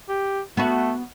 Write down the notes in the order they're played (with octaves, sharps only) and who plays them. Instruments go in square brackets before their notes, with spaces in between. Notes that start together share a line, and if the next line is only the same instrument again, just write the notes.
[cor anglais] G4
[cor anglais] A3 [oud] B3 F#4